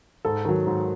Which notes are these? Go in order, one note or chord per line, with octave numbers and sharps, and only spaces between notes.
G#2 A4
D#3 F#3
G#2